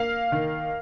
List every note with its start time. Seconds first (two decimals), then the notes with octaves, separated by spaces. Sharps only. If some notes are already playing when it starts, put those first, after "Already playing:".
Already playing: A#3 F5
0.32 D#3